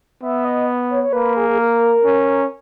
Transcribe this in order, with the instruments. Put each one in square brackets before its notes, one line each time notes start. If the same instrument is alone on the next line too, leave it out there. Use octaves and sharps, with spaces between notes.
[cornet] B3 [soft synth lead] E5
[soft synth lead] D#5
C#5
C#5
[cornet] A#3 [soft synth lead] B4
[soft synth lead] G#4
G#4
A#4
[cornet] C#4